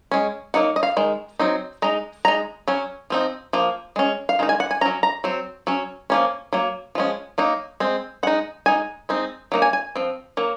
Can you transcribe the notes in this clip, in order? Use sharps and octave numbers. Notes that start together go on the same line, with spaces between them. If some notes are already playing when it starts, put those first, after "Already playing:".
G#3 C#4
F#3 A#3 D#4 F#5
D#5
F5
D#3 G#3
F#3 C4 D#4
G#3 D#4 A#5
G#3 D#4 A#5
F#3 C#4
F3 C4 D#4
F3 A#3
G#3 C#4
F5
D#3 G#3 D#4
G#5
F#5
G#5
F#3 C#4 A#5
A#5
F#3 C4
F#3 C#4
F3 A#3 C#4
F#3 A#3
F3 G#3 C#4
F#3 A#3 D#4
G#3 C4
G#3 D#4 F#5
G#3 D#4 G#5
G#3 C4 D#4
F#3 A#3 D#4
G#5
G#5
F3 C4
F#3 A#3